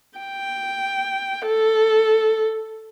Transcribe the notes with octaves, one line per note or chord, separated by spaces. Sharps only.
G5
A4